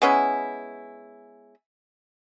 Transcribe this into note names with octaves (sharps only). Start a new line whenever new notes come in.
G#3 B3 C#4 E4